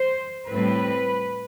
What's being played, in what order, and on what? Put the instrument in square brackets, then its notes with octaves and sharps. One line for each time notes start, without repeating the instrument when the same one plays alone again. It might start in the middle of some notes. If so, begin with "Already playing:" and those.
Already playing: [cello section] C5
A2 G3 C4 B4